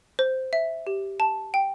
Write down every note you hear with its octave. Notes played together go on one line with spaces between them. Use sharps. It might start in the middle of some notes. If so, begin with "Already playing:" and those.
C5
E5
G4
A5
G5